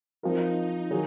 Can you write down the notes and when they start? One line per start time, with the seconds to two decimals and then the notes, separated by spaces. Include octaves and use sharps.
0.22 F3 C4 D#4 F4 A#4
0.91 D#3 F#3 G#4